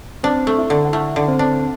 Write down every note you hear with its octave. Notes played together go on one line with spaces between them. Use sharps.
C4 D4 C5
A3
E4 E5
D3
F#5
A3 E4 E5
D3
C4 C5
D4